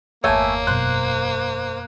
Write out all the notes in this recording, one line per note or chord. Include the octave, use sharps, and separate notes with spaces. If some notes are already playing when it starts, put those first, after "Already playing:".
G1 E2 A3 A#3 C#5 G#5
F#2 B2 C5 F#6